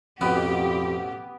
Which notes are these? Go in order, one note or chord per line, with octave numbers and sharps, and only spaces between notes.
A1 F2 B2 B3 G4 B4